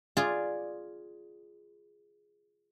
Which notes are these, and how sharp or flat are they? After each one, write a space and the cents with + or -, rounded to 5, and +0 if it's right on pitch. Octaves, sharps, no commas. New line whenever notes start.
F4 +0 G#4 +0 D5 +0